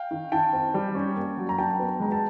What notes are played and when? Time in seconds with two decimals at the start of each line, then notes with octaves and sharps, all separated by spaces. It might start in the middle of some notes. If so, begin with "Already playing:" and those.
Already playing: F5 G5
0.11 D#3
0.32 D#3 G5 A5
0.53 C4
0.74 G3
0.95 C#4
1.16 A#3
1.37 F#3
1.49 A#5
1.58 D4 G5 A5
1.79 B3
2.00 G#3 A#5
2.12 A5